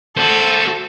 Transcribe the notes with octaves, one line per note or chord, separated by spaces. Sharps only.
F#4 A4 C5